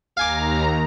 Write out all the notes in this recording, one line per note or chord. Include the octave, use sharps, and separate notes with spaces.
D#2 F5 G#5 A#5 D6